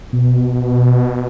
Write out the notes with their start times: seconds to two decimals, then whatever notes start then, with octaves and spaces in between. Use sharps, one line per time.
0.13 B2